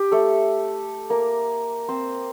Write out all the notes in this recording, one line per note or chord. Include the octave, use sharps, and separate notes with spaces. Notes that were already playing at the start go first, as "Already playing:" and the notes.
Already playing: G4
A3 A4
A#3 A#4
C4 C5